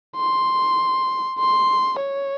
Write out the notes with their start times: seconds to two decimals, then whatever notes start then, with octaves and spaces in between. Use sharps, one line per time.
0.17 C6
1.40 C6
2.00 C#5